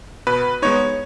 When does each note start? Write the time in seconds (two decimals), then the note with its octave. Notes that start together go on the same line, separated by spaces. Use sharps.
0.27 B2 B4
0.62 G#3 B3 D#4 C#5